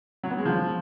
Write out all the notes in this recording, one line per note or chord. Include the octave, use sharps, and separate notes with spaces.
F#3
B3
G#3
F3